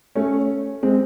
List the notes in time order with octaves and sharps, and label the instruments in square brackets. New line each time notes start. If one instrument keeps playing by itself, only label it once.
[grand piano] A3 C#4
G#3 C4